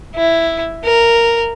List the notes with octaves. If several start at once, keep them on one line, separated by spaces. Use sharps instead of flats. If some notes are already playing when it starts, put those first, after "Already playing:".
E4
A#4